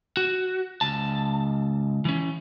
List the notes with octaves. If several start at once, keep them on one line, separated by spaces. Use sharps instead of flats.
F#4
C#2 A5
E3 C#4